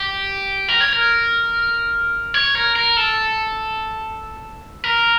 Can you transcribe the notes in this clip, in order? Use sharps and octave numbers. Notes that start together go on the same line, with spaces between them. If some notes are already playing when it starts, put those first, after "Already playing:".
Already playing: G4
A#4
C#5
A#4
C#5
A#4
A#4
A4
A#4